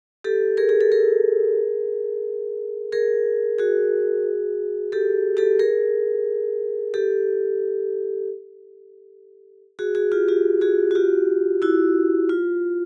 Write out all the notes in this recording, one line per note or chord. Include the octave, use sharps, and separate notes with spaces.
G4 A4
G#4 A#4
G#4
A4
G#4 A#4
G#4 A#4
F#4 G#4
G4 A4
G4 A4
G#4 A#4
G4 A4
F#4 G#4
F#4 G#4
F4 G4
F4 G4
F#4 G#4
F#4
F4 G4
E4 F#4
F4